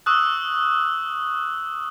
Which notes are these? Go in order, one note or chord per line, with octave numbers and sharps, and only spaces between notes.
C#6 D#6 E6 F#6